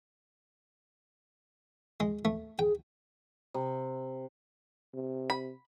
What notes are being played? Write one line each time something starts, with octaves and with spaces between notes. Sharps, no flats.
G#3
A3
G#4 G5
C3
C3
B5